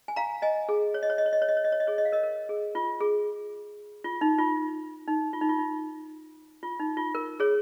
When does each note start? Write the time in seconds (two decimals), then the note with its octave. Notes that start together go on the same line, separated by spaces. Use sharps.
0.08 G#5
0.16 F5 A#5
0.42 D#5 G#5
0.69 G#4
0.94 C#5
1.03 D#5
1.10 C#5
1.18 D#5
1.26 C#5
1.33 D#5
1.42 C#5
1.49 D#5
1.57 C#5
1.64 D#5
1.72 C#5
1.80 D#5
1.87 G#4 C#5
1.98 D#5
2.05 F5
2.12 A#4 D#5
2.23 A#4
2.49 G#4
2.75 F4
3.01 G#4
4.04 F4
4.21 D#4
4.38 F4
5.08 D#4
5.33 F4
5.41 D#4
5.49 F4
5.59 D#4
6.63 F4
6.80 D#4
6.97 F4
7.15 A#4
7.40 G#4 C#5